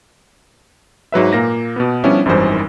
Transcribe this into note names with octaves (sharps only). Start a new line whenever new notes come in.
G#2 F#3 B4 E5
A#2 A#3 A#6
B2 B3
F3 G3 B3 C#4 D4 E4
G#1 F#2 D#3 E3 G3 C5